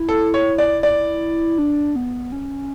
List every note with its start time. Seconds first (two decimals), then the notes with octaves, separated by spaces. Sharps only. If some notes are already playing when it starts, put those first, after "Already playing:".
Already playing: E4
0.09 A4
0.34 C#5
0.58 D5
0.83 D5
1.58 D4
1.96 B3
2.32 C#4